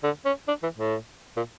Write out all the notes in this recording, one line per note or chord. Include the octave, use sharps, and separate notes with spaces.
D3
C#4
D4
E3
A2
A#2